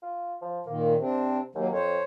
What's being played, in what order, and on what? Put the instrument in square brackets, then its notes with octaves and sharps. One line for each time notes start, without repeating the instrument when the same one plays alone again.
[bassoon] F4
F3
[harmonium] A#2 D#3 [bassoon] A#3
[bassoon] C3 [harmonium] C4 D4
[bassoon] D#2 [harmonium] F#3 A#3
[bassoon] F2 [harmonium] C5 C#5